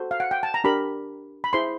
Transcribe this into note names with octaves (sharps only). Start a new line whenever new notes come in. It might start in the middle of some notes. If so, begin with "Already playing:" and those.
Already playing: F#4 A4 C5
F5
F#5
G5
A5
A#5
D4 G4 A#4 B5
B5
E4 G#4 C5 C6